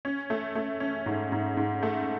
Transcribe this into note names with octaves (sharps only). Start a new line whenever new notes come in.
C#4
A3
A3
C#4
G#2
G#2
G#2
A3